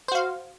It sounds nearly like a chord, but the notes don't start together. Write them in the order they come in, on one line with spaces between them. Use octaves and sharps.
C5 F#4 F5